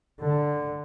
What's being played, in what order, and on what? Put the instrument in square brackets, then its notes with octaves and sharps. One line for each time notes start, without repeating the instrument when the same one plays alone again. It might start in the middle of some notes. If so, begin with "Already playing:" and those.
[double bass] D3